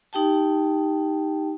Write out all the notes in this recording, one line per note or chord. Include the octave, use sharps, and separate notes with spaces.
D#4 G4 G5 A5